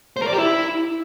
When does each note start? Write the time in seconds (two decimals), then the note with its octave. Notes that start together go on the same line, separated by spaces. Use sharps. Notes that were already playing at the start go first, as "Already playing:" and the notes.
0.17 C5
0.22 A#4
0.27 D5
0.33 G4
0.38 E4